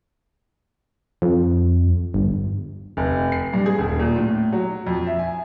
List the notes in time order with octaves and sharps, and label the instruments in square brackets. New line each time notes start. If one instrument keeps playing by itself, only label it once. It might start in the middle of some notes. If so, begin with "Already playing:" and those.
[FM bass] F2
G1
[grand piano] F1
C7
G2
G#4
D#1
A#2
A2
F#3
F2
E5
G#5